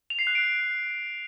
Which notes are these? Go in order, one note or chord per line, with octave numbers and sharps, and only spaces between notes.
F7
C7
F#6
D7